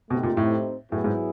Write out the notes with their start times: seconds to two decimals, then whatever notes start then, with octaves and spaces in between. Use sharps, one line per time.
0.10 B2 A3 C4 D#4 G4 C5
0.23 A#2
0.37 A2
0.92 A2 F#3 B3 E4 G#4
1.04 G#2